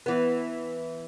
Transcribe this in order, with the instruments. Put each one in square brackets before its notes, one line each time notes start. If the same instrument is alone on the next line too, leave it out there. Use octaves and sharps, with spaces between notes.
[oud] E3 B3